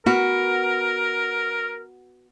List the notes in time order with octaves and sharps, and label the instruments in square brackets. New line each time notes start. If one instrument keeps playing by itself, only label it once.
[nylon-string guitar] B3 F#4 [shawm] A#4